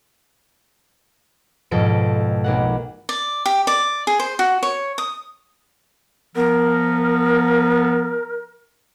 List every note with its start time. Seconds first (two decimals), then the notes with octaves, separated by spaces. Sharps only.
1.71 F2 G#2 B2 A4 D7
2.44 B1 A#3 F#5
3.09 D5
3.46 G4
3.67 D5
4.07 G#4
4.20 C5
4.39 F#4
4.63 C#5
4.98 D#6
6.36 F3 B3 A#4